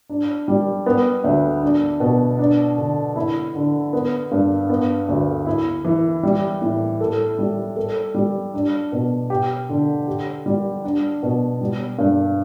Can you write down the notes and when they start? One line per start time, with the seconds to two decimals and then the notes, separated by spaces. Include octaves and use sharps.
0.10 D4
0.48 G3
0.86 B3
1.24 D2
1.63 D4
2.00 B2
2.39 D4
2.77 D3
3.16 E4
3.55 D3
3.93 B3
4.32 G2
4.69 B3
5.08 D2
5.46 E4
5.85 E3
6.23 G3
6.62 A2
7.01 A4
7.39 G3
7.76 A4
8.15 G3
8.54 D4
8.92 B2
9.30 G4
9.69 D3
10.07 G4
10.46 G3
10.84 D4
11.23 B2
11.61 G3
11.99 G2